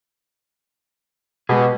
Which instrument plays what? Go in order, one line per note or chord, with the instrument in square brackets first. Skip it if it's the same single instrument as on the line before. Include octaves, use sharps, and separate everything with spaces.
[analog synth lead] B2 [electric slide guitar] G#3 G4 G#4